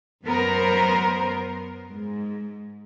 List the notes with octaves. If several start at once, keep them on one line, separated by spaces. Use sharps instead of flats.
F#2 B3 A#4 C5
G#2